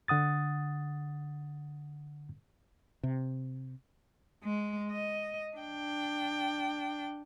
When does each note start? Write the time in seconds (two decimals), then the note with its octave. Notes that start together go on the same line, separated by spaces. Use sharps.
0.08 D3 F#5 D#6 A6
3.03 C3
4.44 G#3
4.92 D#5
5.57 D4 G5